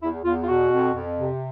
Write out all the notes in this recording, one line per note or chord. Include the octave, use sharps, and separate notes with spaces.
E2 E4
E2 F4
F4
B2 F#4
F2
F2
C3